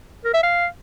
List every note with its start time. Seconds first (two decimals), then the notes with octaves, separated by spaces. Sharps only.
0.25 A#4
0.34 E5
0.43 F5